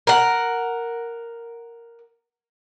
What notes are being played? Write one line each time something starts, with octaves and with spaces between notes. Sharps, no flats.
A#4 F#5